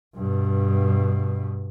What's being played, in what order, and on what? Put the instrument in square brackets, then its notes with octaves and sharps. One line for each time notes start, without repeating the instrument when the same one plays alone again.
[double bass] G2 B2